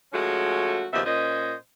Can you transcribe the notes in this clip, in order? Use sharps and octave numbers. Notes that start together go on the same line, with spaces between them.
F3 G#3 A3 C#4 F#4
D#2 C#3 F3 B3 D#4 E5
A#2 C#4 C5 D#5